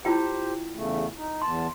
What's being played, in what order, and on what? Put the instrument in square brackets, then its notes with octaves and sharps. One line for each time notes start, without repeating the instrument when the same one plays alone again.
[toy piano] E4 F4 G5 [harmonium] G4 C5
[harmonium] E2 C#3 A3
D#4
[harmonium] E2 A5 [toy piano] C6